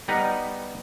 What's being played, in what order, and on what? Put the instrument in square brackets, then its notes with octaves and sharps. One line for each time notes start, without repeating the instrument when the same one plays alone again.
[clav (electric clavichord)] G3 B3 D#4 A#4 F#5